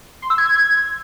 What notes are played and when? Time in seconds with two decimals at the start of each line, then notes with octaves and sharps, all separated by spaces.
0.22 C6
0.30 E6
0.38 G#6